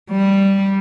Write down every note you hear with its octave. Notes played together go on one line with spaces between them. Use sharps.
G3